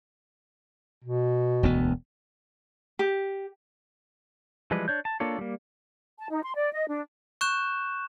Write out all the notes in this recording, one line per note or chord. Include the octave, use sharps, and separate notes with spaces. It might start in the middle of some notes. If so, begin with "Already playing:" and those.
B2
E1 D2 B3
G4
E3 F3 G3 G#3 B4
D4 C#5 G6
A5
A#3 D4 F4 A4 C#5
G3 A#3
A5
D#4
C6
D5
D#5
D4
C#6 F#6 G6 E7